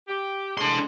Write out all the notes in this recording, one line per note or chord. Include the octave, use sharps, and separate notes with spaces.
G4
A2 G#3 D4 C6